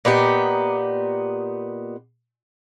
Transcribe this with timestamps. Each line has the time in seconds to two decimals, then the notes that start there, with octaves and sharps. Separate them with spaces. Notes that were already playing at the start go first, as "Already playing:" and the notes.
0.05 A#2 B3 D#4 G4